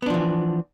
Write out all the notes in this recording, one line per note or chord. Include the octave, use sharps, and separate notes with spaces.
E3 F3 B3 D4